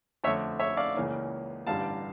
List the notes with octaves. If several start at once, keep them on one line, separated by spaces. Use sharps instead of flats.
F2 D3 A3 C#5 E5
C#5 E5
D5 F5
C#2 C#3 E3 A#3 C#4
A1 G2 D3 G3 F5 A5